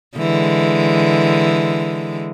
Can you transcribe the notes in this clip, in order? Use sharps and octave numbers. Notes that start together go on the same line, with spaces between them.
D3 E3 G#3